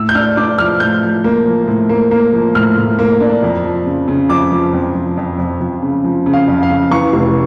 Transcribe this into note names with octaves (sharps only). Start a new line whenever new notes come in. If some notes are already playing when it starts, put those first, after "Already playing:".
Already playing: A2 E6
G6
D4 F6
D4 D6
F3 F6
A2 G6
F3
A#3
F3
A2
A#3
A#3
F3
A2 F6
A2
A#3
D4
F2
F3
C#3
C#3
F2 D6
F3
F2
F3
F2
F2
F2
C#3
F3
C#3
F5
F2
F5
C#3
E3 C#6
F1